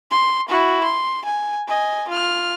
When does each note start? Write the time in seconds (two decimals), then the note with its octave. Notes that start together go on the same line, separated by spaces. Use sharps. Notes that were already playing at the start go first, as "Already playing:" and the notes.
0.11 C6
0.49 E4 F#4
0.84 C6
1.26 G#5
1.68 D#5 G#5
2.08 F4 F6